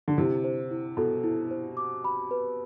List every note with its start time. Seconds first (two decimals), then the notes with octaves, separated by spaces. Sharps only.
0.08 D3
0.18 C3 E4
0.44 C5
0.71 E4
0.97 B2 A4
1.24 E4
1.51 C5
1.77 D6
2.05 B5
2.31 B4